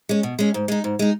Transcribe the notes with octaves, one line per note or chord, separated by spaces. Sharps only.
G#3 C#4
B2
G#3 C#4
G#2
G#3 D#4
G#2
G#3 D#4